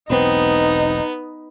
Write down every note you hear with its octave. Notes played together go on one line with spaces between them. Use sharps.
E1 B1 B3 C4 D#4